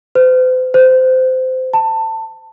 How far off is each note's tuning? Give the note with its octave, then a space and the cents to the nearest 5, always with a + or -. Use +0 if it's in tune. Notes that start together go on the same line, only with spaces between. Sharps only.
C5 -45
C5 -20
A5 +20